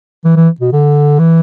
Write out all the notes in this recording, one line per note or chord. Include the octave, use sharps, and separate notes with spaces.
E3
E3
B2
D3
E3